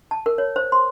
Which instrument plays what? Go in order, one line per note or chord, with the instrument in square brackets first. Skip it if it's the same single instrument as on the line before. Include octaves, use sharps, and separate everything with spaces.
[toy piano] A5
A#4
C#5
C5
C6